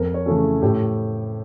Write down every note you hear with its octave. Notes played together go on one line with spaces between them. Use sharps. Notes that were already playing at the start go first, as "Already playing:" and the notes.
Already playing: F2 A#4
C#5
C#3 E3 A3 C#4
G#4
A2 G4